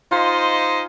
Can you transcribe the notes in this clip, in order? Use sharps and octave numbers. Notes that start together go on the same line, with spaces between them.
D#4 F4 C5 D#5 G#5 C6